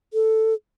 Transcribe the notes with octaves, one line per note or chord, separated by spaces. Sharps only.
A4